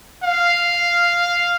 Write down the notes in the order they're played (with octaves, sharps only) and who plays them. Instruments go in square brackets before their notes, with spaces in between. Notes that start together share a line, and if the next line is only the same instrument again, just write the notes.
[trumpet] F5